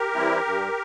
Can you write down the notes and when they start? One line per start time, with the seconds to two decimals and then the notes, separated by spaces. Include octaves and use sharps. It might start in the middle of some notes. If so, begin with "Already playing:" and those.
Already playing: G4 A#4
0.15 E3 G3 C4 E4
0.45 G2